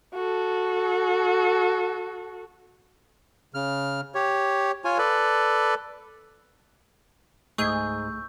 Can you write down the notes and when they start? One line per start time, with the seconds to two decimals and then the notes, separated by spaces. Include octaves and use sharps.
0.14 F#4 A4
3.54 C#3 F6
4.15 G4 C#5
4.84 F4 C#5 G#5
4.98 A4 B4 D5
7.58 C#2 G#2 A3 G#4 C#6 E6 G6